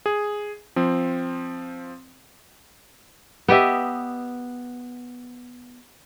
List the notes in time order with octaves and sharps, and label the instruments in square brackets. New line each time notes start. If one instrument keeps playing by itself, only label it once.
[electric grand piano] G#4
F3 C4
[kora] B3 G4 D#5 E5